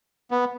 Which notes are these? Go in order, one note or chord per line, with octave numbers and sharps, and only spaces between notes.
B3